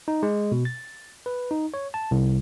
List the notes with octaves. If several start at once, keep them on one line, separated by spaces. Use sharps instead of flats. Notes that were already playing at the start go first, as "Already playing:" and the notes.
D#4
G#3
B2
A6
B4
D#4
C#5
A5
C2